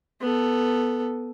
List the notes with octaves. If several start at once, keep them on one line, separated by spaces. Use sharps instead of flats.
B3 A4